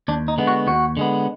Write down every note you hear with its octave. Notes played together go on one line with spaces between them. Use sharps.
D#2 D4
D#4
D3 G#3 B3
F#4
D#2 F#4
D3 G#3 B3